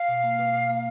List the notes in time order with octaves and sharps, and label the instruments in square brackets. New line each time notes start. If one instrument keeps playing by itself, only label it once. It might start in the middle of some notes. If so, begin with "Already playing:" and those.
Already playing: [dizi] F5
[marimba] B2
A#3
B2
B2
A#3